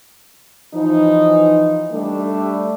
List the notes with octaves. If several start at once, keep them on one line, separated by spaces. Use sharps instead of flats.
E3 F3 D#4
G3 A3 D4